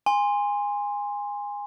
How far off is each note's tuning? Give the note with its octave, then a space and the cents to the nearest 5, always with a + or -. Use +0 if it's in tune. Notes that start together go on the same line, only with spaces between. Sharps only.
G#5 -20 C6 +0